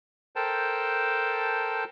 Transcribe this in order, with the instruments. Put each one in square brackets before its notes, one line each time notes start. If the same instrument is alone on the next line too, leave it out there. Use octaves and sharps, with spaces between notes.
[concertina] A4 A#4 C5 G5 A5